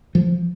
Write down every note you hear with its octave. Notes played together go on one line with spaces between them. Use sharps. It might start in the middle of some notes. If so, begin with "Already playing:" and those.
F3